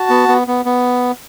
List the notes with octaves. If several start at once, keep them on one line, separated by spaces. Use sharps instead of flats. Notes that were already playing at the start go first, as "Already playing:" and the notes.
Already playing: F#4 A5
B3
B3
B3
B3